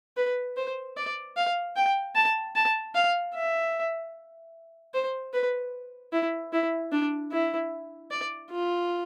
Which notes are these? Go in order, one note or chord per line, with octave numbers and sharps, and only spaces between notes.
B4
C5
D5
F5
G5
A5
A5
F5
E5
C5
B4
E4
E4
D4
E4
D5
F4